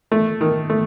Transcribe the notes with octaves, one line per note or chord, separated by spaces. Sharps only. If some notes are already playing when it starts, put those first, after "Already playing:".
A3
D#3
A3